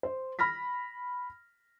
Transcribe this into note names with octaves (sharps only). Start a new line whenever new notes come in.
C5
B5 F6 A#6 B6